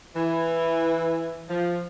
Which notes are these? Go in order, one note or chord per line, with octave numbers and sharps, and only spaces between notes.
E3
F3